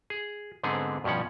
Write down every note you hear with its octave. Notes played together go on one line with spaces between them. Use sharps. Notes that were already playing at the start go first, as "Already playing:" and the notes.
G#4
G#2 D3 B3 C4 G#4
G2 B2 F3 C#4 F#5